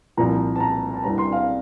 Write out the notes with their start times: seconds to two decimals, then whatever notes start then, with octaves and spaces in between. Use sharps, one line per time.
0.17 C2 A#2 F3 A#5
0.56 A5
0.60 A#5
0.94 A5
1.04 C2 C3 G3 D4 A#5
1.18 C6
1.32 F5